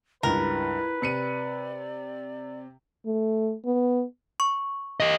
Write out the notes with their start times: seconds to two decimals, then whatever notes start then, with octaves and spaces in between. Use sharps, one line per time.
0.23 C#2 G2 E4 A#4 B4
1.02 C3 D5 C#7 D#7
3.06 A3
3.66 B3
4.40 C#6
5.00 G4 D#5